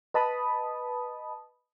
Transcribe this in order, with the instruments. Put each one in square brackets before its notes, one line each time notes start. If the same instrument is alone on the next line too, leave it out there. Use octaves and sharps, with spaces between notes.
[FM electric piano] B4 D#5 A5 B5 D#6